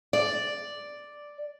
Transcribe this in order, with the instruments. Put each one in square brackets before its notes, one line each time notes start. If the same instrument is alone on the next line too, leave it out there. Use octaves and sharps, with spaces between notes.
[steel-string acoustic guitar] D5